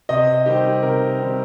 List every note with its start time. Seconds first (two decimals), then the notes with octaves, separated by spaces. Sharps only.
0.09 C3 D#5
0.46 D#3 G3 C4 G4
0.82 C3 A#4
1.19 D#3 G3 C4